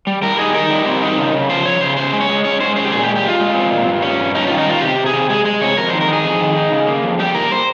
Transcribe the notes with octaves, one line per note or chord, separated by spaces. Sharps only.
G3
G3 A#4
D#4 G#4
D#4 A#4
G3
C4
D#4
C#3
C#3
F3 C5
F3 C#5
C#3 C5
C#4 C5
G#3
C#5
G#3
C#4 C#5
G#3 C5
C#4 C5
G4
A#2 G#4
G4
G#3
G4
G#3 F4
G#3
C4
A#2
G2
C#4
G2
C#4 D#4
D#3 F4
D#4
G2 F4
C3 G4
C3
G#4
C3
G#3 G#4
G#3 G#4
C3 C#5
F2 A#4
D#3 C5
A#4
D#4 G#4
F2
D#3
D#4
C#3
A#3
F2
G3 G4
A#3 A#4
C5